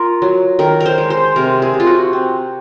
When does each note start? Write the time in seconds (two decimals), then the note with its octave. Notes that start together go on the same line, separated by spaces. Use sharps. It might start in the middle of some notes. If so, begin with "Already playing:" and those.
Already playing: F4 A#4
0.22 F#3
0.59 D#3 A#4
0.80 A#4
0.86 C5
0.98 G#3
1.10 C5
1.36 C3 A#4
1.62 G#4
1.74 C3
1.80 F4
1.86 F#4
2.13 C4